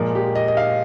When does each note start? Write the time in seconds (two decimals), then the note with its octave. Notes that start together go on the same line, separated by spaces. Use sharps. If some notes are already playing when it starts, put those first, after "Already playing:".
Already playing: A#2 F3 G#3 A#4
0.15 G4
0.35 D#5
0.48 D#5
0.57 F5